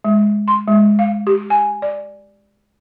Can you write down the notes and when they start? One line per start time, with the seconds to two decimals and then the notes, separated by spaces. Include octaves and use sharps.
0.04 G#3
0.48 C6
0.68 G#3
0.99 F5
1.27 G4
1.50 G#5
1.82 D5